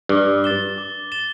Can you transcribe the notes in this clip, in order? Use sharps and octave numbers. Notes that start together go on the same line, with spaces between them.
G2 D6
A6 E7 G7
D6
A6 E7 G7